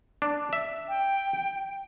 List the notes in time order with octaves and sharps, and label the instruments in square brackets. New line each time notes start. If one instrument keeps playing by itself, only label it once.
[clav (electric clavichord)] D4
E5
[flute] G5